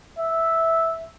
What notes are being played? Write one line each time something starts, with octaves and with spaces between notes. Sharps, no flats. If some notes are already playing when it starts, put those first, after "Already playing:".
E5